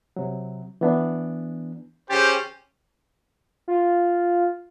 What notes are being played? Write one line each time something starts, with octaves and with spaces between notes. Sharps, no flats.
C3 F#3
E3 B3 D4
C#4 G4 G#4 C5 G5 A6
F4